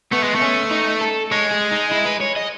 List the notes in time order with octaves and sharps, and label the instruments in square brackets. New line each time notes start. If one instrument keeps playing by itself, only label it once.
[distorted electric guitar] A3 [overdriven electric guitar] B3
[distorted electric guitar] G#3
A3
[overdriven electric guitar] C#4
D#4
A4
[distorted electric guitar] G#3 [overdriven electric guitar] C#5
[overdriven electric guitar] G#4
D#4
E4
B4
C#5
D#5